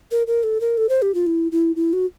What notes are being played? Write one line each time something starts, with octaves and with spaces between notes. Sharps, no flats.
A#4
A#4
A4
A#4
A4
C5
G4
F4
E4
E4
E4
F#4